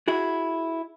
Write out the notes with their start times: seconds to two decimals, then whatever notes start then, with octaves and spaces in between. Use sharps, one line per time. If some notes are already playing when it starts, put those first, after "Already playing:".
0.08 E4 F#4 G#4